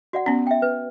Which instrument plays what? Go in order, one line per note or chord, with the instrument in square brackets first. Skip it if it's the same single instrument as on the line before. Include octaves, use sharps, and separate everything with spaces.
[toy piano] F#4 D5 F#5
[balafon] B3 C#4
[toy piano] E5 G5
B4